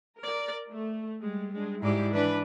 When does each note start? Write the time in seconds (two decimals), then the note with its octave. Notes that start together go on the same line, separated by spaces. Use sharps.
0.19 A#4 D5
0.71 A3
1.21 G3 G#3
1.52 G#3 D4
1.82 G#2 E4 G4 D5
2.13 E3 D4 B4